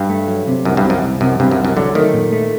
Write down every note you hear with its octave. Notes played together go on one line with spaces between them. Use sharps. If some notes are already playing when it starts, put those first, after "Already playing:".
Already playing: G2
A3
F#3
C3
C2 F#2
G2
C3
F#2
C2
F#2 C3
G2 C3
F#2
C2
F#2
D3 F#3
D#3 A3
A#2
A3